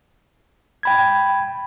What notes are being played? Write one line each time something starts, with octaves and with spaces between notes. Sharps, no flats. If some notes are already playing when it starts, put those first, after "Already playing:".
G5 B5 G#6